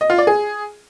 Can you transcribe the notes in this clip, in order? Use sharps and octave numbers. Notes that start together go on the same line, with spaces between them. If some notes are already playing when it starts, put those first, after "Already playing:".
D#5
F4
D5
G#4